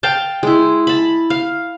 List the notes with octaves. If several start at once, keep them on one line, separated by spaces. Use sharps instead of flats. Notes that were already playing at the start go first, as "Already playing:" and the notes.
F5 G5 A5
G#3 E4
A5 B5
F5